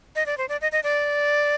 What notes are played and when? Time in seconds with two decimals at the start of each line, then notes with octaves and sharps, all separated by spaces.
0.16 D#5
0.26 D5
0.38 C5
0.49 D5
0.61 D#5
0.72 D#5
0.83 D5